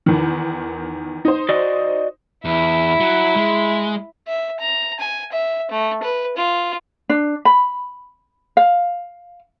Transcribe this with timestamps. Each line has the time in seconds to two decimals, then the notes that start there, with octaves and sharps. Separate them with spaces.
0.06 E2 D#3
1.25 D#4 C5
1.49 F#4 D5 D#5
2.45 E2 E4
3.00 F#3
3.36 G#3
4.27 E5
4.60 A#5
4.99 G#5
5.32 E5
5.71 A3
6.02 B4
6.36 F4
7.09 D4
7.45 B5
8.57 F5